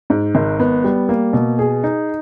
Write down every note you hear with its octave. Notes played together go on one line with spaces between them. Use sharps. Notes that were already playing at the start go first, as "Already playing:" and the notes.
G#2
G#1
B3
G3
A#3
B2
G#4
D#4